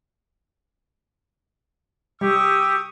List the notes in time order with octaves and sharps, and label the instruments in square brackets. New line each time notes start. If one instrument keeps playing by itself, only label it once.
[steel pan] G3 [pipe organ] G4 [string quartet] C#6 D#6 [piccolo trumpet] E6